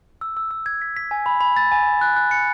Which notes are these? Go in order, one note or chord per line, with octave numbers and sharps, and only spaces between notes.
E6
E6
E6
G#6
B6
B6
G#5
B5
B5
A6
G#5
G#5
F#6
F#6
C#7